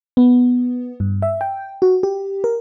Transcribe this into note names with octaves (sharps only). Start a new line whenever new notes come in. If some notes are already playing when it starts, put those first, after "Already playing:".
B3
G2
E5
G5
F#4
G4
A#4